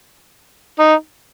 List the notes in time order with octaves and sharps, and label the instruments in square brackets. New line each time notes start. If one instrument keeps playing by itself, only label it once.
[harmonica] D#4